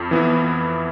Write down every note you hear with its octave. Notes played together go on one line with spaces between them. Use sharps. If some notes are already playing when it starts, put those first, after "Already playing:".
Already playing: F2
E3 B3 E4